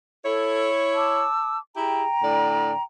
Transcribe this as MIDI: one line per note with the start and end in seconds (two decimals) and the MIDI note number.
0.25 1.24 64
0.25 0.68 69
0.25 1.24 73
0.95 1.58 81
0.95 1.58 86
0.95 1.58 88
1.76 2.05 64
1.76 2.05 67
1.76 2.05 68
1.76 2.81 79
1.76 2.81 82
2.22 2.73 45
2.22 2.73 50
2.22 2.73 74